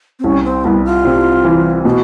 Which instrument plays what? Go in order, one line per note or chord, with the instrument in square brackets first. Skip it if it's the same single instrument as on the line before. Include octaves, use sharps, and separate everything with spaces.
[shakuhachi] C4
[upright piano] C2 [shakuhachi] C#4
[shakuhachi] C4
[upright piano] C2 [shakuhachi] B3
[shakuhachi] F4
[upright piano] C3
E3
[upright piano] B2 [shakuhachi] F#4